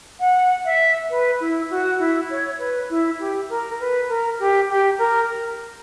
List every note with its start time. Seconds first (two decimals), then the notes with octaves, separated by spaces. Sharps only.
0.20 F#5
0.65 E5
1.10 B4
1.41 E4
1.70 F#4
1.99 E4
2.30 C#5
2.59 B4
2.90 E4
3.20 G4
3.50 A#4
3.80 B4
4.09 A#4
4.40 G4
4.70 G4
4.99 A#4